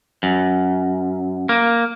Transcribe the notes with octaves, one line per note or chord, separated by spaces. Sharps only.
F#2
A#3